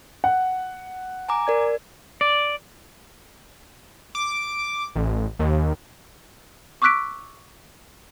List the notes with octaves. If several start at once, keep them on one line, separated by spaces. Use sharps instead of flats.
F#5
G#5 A#5 D6
A#4 D5 G#6
D5
D6
A1
D#2
C#6 D6 E6 F#6 B6 D7